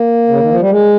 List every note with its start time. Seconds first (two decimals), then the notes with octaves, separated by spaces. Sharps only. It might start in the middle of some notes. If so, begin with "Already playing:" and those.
Already playing: A#3
0.28 C#3
0.39 D#3
0.50 F3
0.60 G3
0.70 G#3